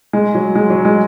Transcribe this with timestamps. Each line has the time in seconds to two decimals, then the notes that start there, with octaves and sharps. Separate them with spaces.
0.13 G#3
0.35 F#3
0.55 G#3
0.70 F#3
0.85 G#3